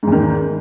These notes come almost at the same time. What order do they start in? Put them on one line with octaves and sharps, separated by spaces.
G#2 E2 D#3